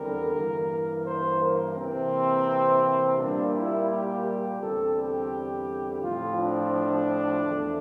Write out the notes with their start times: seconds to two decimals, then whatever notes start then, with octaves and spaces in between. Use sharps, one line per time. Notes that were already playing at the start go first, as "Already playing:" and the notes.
Already playing: E2 D3 G3 C4 A#4
0.35 G2 E3 A#3
1.07 C5
1.42 A#4
1.77 C3 E3 A#3 C4
3.18 A#2 G3 A#3 D4
3.54 E4
3.89 G4
4.25 G4
4.60 E2 D3 G3 C4 A4
4.95 G4
6.01 A2 F3 C4 F4
6.37 D4
7.43 E2 D3 F3 A3